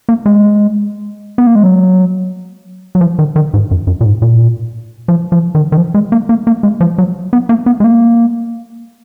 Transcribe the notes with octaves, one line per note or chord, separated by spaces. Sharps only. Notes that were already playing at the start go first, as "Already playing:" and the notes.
A#3
G#3
B3
A#3
G#3
F#3
F#3
F3
D#3
D#3
G#2
F#2
F#2
A#2
G#2
A#2
F3
F3
D#3
D#3
F3
G#3
A#3
A#3
A#3
G#3
F3
F#3
B3
A#3
B3
G#3
A#3